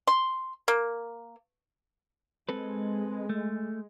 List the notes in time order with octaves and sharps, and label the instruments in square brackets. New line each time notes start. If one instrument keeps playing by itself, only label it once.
[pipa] C6
A#3
[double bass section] G#3 [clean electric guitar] C4 A4 B4
[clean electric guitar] A3